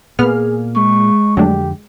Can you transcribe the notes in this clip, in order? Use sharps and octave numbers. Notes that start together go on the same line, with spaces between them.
A#2 A#3 B3 G#4 F6
G#3 C#6
F2 D3 F#3 A3 D4 G4